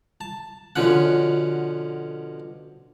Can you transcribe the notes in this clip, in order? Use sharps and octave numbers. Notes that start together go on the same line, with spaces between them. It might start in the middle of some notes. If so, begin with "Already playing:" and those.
A5
B2 D3 F3 C#4 F#5